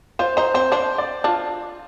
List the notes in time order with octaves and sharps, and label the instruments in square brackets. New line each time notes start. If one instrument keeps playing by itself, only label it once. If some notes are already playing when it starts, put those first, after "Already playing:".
[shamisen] F4 [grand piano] C5
[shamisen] D#4 [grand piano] C5
[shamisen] C4 [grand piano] C5
[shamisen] D4 [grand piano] C5
[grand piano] D5
[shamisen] D4 [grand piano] F4